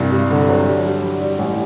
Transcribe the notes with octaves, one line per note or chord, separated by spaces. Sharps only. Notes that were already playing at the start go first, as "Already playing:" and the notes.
Already playing: C2 G2
G2
D3
F#3
G3
G3
G3
G3
A1